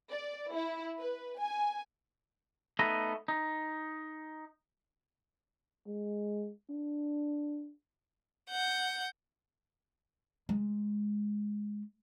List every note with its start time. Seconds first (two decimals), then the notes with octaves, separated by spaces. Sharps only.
0.10 D5
0.54 E4
0.99 B4
1.39 G#5
2.79 A3 B3 D#4 D#5
3.28 D#4
5.87 G#3
6.70 D4
8.50 F#5 G6
10.49 G#3